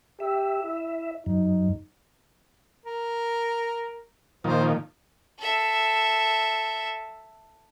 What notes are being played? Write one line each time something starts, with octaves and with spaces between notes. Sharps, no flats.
G4 E5
E4
F#2 D#4
A#4
A#2 D#3 F3 C5
A4 E5